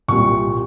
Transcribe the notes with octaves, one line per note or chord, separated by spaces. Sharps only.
C2 A#2 G3 C#6